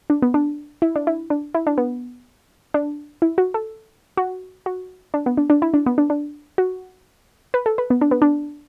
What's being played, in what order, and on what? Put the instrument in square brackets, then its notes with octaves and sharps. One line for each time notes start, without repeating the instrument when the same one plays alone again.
[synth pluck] D4
B3
D4
E4
D4
E4
D4
E4
D4
B3
D4
E4
F#4
A4
F#4
F#4
D4
B3
D4
D4
E4
D4
B3
D4
D4
F#4
B4
A4
B4
B3
D4
B3
D4